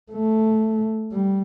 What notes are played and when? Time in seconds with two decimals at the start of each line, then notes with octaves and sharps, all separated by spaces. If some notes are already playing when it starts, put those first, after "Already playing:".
0.12 A3
1.13 G3